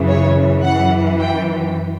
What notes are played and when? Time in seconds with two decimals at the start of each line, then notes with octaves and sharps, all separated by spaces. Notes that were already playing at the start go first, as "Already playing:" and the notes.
Already playing: F#2 C#3 E3
0.08 C#5
0.64 F#2 E3 F#5
1.19 G5